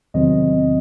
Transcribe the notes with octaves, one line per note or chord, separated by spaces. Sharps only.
E2 C3 D#3 F#3 C4 D#5